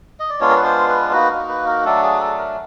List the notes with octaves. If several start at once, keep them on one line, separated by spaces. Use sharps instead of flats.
D#5
D5
G#3 B3 D4 F4 C#5
A#4
B4
C5
B4
A#3 D#4 F#4 B4
A#4
B4
A#4
F#3 A3 D4 A4
G#4
A4
A#4